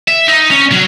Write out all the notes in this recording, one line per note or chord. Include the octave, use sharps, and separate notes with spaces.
E5
D#4
C#4
F#3